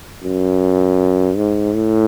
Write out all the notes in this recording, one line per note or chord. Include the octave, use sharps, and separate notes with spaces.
F#2
G#2
A2